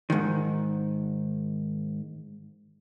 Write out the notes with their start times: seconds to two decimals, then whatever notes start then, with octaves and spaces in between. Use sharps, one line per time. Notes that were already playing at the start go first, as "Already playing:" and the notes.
0.10 G#2 D#3